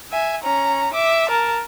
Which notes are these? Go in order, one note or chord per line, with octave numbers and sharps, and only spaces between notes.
E5 G#5
C#4 A#5
E5 D6
A#4 A5